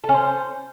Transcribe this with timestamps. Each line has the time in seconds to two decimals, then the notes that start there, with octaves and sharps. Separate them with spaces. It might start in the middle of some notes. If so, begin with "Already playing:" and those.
0.04 A4
0.09 C#4
0.14 C5